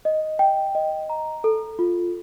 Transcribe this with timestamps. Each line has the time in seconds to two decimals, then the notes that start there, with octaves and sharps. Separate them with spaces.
0.05 D#5
0.39 G5
0.75 D#5
1.10 A#5
1.44 A4
1.79 F4